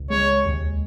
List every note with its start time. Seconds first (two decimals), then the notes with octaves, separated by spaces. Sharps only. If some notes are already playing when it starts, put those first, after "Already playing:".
Already playing: C#2
0.10 G#3 C#5
0.46 D#2